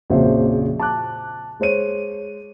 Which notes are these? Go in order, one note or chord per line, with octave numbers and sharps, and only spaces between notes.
A#1 F2 C#3 F#4 C5 E5
A5 D6 F#6
G#3 C5 C#5 D#7